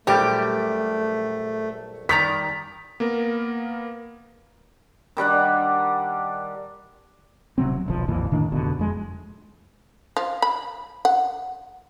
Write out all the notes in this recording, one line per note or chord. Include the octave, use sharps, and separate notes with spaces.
A#1 F#2 G3 A3 G4
D#3 G3 D5 A#5 B6
A#3 B3 A#4
D#3 G3 D4 F#5
D1 C3 F#3 C4
D#1 B1 F3
B1 F2 A#2 E3
D2 A2 D#3 D4
F1 B2 D3
F2 G#3
F3
B5
F#5